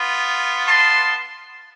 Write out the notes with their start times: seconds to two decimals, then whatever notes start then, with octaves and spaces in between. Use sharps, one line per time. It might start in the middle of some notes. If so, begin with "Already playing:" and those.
Already playing: B3 F4
0.65 A5 C6